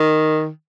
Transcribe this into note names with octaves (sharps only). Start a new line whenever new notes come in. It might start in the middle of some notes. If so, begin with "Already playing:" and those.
Already playing: D#3